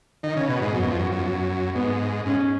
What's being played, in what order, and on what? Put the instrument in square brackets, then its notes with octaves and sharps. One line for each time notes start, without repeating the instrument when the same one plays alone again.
[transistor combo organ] D#3
C#3
B2
G#2
[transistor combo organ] F#2 [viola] B3
[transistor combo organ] F2
F#2
F#2
F2
F#2
[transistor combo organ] G#2 [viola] B3
[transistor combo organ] G#2 [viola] C#4